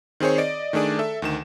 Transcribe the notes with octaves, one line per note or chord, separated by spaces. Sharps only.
D#3 C4 G#4 C5 C#5
D5 D#5 D7
D#3 A3 D4 G#4 D5
A4 E5
D2 D#3 E7